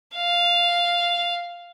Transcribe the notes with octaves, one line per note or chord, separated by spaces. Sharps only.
F5